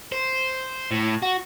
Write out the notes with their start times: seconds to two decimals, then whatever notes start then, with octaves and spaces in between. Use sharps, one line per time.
0.12 C5
0.91 A2
1.22 F#4